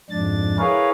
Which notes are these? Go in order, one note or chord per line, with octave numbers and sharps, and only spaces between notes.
F2 G#2 D4 A6
E4 G#4 A#4 B4 C#5 F5